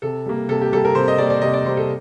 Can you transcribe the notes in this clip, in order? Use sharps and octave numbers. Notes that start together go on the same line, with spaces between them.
C3 A4
G3 A#3
C3 A4
G4
G3 A#3 A4
A#4
C3 C5
D#5
G3 A#3 D5
D5
C3 D#5
D5
G3 A#3 C5
A4